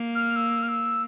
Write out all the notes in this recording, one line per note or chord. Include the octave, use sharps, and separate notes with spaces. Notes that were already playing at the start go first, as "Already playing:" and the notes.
Already playing: A#3
F6
E6
F6
E6